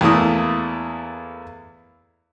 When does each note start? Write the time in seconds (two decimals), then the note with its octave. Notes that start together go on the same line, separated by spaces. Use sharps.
0.01 E2 A3 A#3 E4 D#6